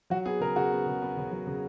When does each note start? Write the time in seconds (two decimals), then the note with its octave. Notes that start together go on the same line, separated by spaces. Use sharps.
0.10 F#3 F#4
0.25 B3 G#4
0.40 C#3 A#4
0.56 C#3 F#4
0.72 B3
0.86 C#3
1.02 B3
1.17 C#3
1.31 F#3
1.47 C#3